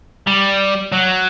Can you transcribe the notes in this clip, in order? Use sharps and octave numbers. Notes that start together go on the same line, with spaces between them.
G3
F#3